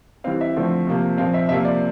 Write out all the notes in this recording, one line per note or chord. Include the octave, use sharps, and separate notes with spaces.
E3 G3 C4 F5
E5
D3 F3 A3 C4
C3 F3 A#3
A#2 F3 C4 F5
E5
C3 F3 A#3 E5
D5